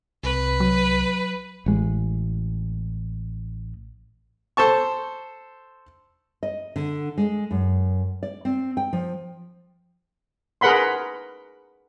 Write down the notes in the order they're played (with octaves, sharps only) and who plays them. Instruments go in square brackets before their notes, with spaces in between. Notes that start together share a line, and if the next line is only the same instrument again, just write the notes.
[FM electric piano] C2 [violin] B4
[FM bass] F#3
[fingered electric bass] A1 G#3
[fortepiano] A4 C5 A5 C#6
[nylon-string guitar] D#5
D3
G#3
F#2
D5
C4
G5
F3
[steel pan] G#4 A#4 B4 F#5 B5 C6